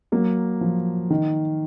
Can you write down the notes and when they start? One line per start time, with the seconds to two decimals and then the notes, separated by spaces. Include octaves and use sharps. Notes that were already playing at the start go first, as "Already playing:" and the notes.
0.12 F#3 A#3
0.61 F3
1.10 D#3